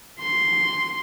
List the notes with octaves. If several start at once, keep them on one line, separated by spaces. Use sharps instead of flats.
C6